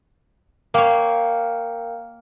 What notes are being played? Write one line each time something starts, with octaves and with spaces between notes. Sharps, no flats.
A#3 A#4 C#5 F5 G5